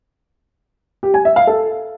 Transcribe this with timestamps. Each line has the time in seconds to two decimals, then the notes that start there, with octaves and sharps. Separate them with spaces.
1.03 G4
1.14 G#5
1.25 E5
1.36 F5
1.47 A4